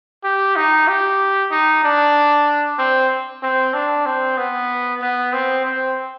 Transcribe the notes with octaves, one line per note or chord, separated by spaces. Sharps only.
G4
D#4
G4
D#4
D4
C4
C4
D4
C4
B3
B3
C4
C4